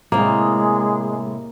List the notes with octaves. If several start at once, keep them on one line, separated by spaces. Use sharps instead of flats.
A2 C3 G#3 A#3